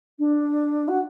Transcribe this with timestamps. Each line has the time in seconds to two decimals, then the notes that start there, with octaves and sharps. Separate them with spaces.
0.19 D4
0.88 F#4